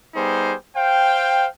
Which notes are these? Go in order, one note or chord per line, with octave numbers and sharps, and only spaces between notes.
G3 B3 D#4 G#4 C5
C5 F5 G5